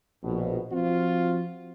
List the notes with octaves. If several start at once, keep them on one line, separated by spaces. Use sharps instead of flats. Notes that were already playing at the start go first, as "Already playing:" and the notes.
A#1 B2
F3 C4 F4 F#4